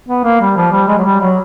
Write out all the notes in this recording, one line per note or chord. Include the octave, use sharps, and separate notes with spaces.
B3
A#3
G3
F3
G3
G#3
F#3
G3
F#3